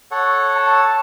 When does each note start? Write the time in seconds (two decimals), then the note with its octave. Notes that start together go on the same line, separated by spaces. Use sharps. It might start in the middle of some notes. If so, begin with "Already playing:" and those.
0.11 A4 C#5 F#5
0.57 A5